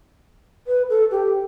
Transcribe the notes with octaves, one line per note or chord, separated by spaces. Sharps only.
B4
A4
G4